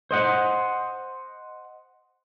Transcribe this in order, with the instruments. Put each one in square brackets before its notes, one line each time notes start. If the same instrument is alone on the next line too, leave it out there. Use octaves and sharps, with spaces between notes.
[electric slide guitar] C5 D#5 F#5